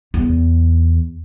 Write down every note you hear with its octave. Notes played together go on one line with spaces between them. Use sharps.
E2